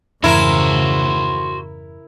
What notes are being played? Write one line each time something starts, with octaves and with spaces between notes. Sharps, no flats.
F2 G#2 C#3 E3 E4 F#4 A#4 C5